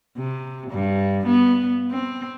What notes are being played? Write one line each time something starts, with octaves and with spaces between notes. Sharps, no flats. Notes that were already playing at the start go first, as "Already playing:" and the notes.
C3
G2
B3
C4